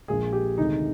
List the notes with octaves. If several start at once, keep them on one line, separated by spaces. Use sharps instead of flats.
A#1 A#2 G#3 G#4
G4
D2 C3 D#3 G#3 D#4